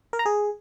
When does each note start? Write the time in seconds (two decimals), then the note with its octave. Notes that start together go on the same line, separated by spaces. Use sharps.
0.13 A#4
0.19 A#5
0.26 G#4